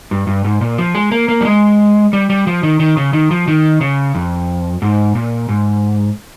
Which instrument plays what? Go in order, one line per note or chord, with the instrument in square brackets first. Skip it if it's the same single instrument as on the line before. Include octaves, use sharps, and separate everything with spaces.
[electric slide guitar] G2
G2
G#2
A#2
F3
G#3
A#3
A#3
G3
G#3
G3
G3
F3
D#3
D#3
C#3
D#3
F3
D#3
C#3
F2
G#2
A#2
G#2